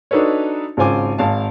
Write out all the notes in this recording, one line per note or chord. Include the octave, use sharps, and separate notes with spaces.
D4 D#4 F#4 A4 B4 C#5
G#1 C#3 F4 C5 G#5 D6
G#1 F5 A5